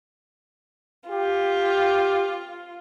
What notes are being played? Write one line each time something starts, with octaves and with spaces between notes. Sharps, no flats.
F4 G4